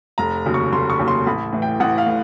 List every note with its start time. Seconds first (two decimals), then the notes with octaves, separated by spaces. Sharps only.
0.18 F1 A#5
0.45 D#2 C#3 F#3
0.54 C#6
0.72 F1 C6
0.90 C#6
0.99 D#2 C#3 F#3
1.08 C6
1.27 A1 B5
1.53 A2 E3
1.62 G5
1.80 A1 F#5
1.98 F5
2.07 A2